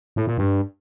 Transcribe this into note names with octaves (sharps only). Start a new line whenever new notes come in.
A2
A#2
G2